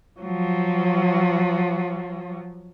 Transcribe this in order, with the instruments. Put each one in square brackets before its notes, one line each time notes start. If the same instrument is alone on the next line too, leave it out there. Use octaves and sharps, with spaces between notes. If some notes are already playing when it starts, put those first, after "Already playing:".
[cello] F3 F#3